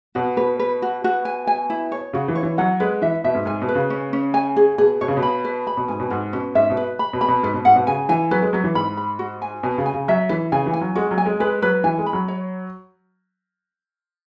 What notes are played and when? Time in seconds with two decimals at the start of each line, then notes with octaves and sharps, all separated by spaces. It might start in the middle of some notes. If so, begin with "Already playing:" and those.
0.15 B2 F#4
0.37 B2 B4
0.59 B4
0.82 F#4
1.04 F#4
1.25 G#5
1.47 G#5
1.70 E4
1.92 C#5
2.13 C#3 F#4
2.28 E3
2.35 C#5
2.43 E3
2.58 F#3 F#5
2.80 G#3 B4
3.02 E3 E5
3.24 B2 E5
3.35 G#2
3.46 G#2 G#5
3.62 B2
3.68 B4
3.75 C#3
3.90 C#4
4.13 C#4
4.34 G#5
4.56 G#4
4.78 B2 G#4
5.01 B2 C#5
5.08 C#3
5.17 B2
5.23 B5
5.45 B4
5.67 B5
5.77 B2
5.88 G#2 G#5
6.00 B2
6.10 G#2 F#4
6.33 B2 C#4
6.55 G#2 E5
6.70 B2
6.77 B4
6.99 B5
7.13 B2
7.21 B5
7.28 B2
7.43 G#2 B4
7.54 B2
7.65 G#2 F#5
7.76 B2
7.87 C#3 G#5
8.09 E3 G#5
8.31 F#3 B4
8.42 G#3
8.53 F#3 B4
8.64 E3
8.75 G#2 B5
8.97 B5
9.19 F#4
9.42 G#5
9.63 B2 G#5
9.78 C#3
9.86 G#5
9.94 C#3
10.08 F#3 E5
10.29 E3 B4
10.52 C#3 G#5
10.66 E3
10.73 G#5
10.81 F#3
10.96 G#3 F#4
11.11 F#3
11.18 G#5
11.26 G#3
11.40 G#3 B4
11.62 F#3 B4
11.84 E3 G#5
11.98 G#3
12.06 B5
12.13 F#3
12.28 C#5